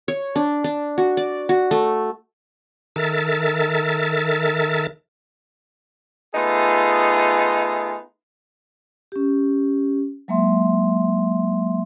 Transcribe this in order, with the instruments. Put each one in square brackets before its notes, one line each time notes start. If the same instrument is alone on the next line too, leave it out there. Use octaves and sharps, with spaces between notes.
[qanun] C#5
D4
D4
F#4
D5
F#4
A3
[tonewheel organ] D#3 A4 A#4 E5 A6
[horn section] A3 B3 D#4 F4 G#4
[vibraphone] C#4 G4
F#3 G#3 A#3 E5 C6